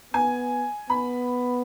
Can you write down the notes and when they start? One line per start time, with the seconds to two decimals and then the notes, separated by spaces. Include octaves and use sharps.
0.14 B3 G#5
0.90 B3 B5